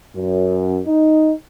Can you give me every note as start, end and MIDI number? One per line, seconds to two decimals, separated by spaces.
0.16 0.80 42
0.87 1.32 63